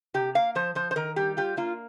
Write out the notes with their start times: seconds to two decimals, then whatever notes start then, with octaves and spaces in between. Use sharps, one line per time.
0.14 C3 G4
0.35 A#3 F5
0.55 F3 C5
0.75 F3 C5
0.91 C5
0.96 D#3 A#4
1.16 G3 G4
1.37 F4 G4
1.57 A#3 F4